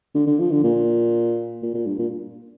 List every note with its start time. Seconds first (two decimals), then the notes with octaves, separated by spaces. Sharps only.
0.15 D3
0.26 D3
0.39 F3
0.51 D3
0.64 A#2
1.63 A#2
1.74 A#2
1.87 G2
1.99 A#2